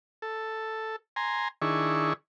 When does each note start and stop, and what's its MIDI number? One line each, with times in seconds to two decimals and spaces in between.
0.22 0.96 69
1.16 1.48 80
1.16 1.48 82
1.16 1.48 84
1.62 2.13 51
1.62 2.13 62
1.62 2.13 64
1.62 2.13 68
1.62 2.13 85